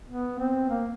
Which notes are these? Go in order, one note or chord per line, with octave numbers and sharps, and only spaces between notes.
B3
C4
A#3